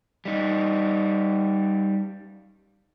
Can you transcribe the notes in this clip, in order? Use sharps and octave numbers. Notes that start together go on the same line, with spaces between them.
G3 D#4